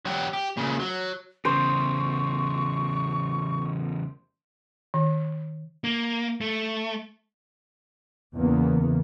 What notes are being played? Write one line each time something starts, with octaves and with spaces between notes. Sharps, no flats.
F#3 G4
G4
A#2 C#3
F#3
E2 C#3 C5 C#6
D#3
A#3
A3
E2 C#3 E3 A#3 B3